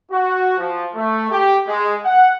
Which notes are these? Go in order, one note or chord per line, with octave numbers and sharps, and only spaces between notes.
F#4
F3
A3
G4
G#3
F#5